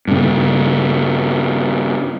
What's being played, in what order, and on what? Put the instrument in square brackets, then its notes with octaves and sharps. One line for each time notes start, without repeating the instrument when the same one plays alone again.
[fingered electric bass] G2 C#3